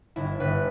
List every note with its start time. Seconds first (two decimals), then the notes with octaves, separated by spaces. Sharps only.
0.16 G1 E4
0.40 G1 B4